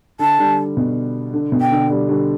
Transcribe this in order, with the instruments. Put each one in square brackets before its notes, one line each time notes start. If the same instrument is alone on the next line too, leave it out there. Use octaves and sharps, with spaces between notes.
[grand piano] D3 [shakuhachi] A5
[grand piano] D3 G3
B2
D3
B2
[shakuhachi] G5
[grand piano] D3
D3 G3
D3 G3